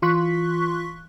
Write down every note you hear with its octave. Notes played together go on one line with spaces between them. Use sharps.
E3 F4 C6 C#6 F#6 B6